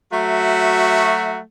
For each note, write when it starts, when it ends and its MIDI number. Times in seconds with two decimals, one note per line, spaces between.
0.11 1.37 54
0.11 1.37 57
0.11 1.37 66
0.11 1.37 76